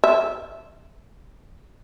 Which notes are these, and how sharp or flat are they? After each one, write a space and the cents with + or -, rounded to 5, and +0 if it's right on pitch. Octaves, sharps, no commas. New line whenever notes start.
E5 -5